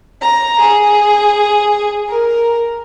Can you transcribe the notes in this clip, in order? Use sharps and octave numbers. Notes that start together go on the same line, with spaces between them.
A#5
G#4
A#4